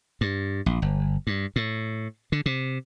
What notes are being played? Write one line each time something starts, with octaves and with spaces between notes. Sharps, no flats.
G2
A#1
G1
G2
A2
D3
C3